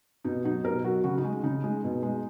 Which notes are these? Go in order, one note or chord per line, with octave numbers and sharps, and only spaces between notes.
B2 D#4
F#3 D#4
B2 A#4
F#3 F#4
C#3 F#4
D#4
G#3
C#3 D#4
G#3
B2
G#3